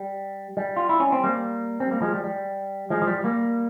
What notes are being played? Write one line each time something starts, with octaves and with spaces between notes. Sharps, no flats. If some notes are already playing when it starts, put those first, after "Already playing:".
Already playing: G3
G3
F4
E4
C#4
C4
G3 A#3
C4
G3 A#3
F3 G#3
G3
G3
F3 G#3
F3
G3
G3 A#3